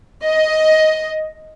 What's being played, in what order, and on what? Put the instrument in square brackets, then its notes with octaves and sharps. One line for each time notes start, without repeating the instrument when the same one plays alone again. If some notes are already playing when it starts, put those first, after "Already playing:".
[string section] D#5